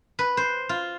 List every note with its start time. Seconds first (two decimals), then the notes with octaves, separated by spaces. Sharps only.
0.19 B4
0.37 C5
0.69 F4